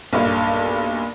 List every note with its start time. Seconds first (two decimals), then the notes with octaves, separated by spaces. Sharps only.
0.13 B1 G2 A#2